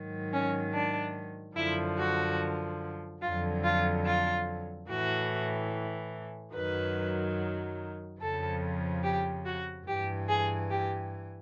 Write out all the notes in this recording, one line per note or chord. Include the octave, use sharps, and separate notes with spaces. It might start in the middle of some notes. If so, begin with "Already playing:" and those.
Already playing: G#2 D#3 F#3
C#4
D4
F#2 D3 F3 E4
F#4
F2 D3 F#3 F4
F4
F4
A2 E3 F#4
F#2 D#3 F#3 B4
F2 C#3 F3 A4
G4
F#4
G2 E3 G4
G#4
G4